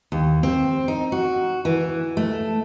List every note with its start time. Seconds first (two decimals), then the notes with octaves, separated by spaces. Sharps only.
0.12 D#2
0.43 C4
0.88 D#4
1.12 F#4
1.65 E3
2.17 A3